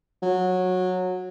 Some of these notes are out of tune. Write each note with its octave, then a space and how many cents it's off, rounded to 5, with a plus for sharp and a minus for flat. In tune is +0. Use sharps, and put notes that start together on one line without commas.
F#3 -15